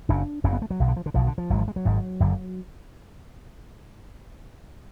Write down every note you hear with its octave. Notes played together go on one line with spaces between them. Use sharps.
F#1 F#2 C#3 D4
F#1 F#2 C#3 C#4
B3
A3
F#3
B1 B2
D3
F3
D3
B1 B2 F3
D3
F3
G#1 G#2 F#3
F3
G#3
F#3
G#1 G#2
F#1 F#2 D3